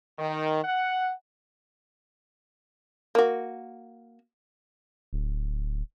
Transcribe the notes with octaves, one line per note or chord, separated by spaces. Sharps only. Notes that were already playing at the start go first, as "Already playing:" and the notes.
D#3
F#5
A#3 F#4
D1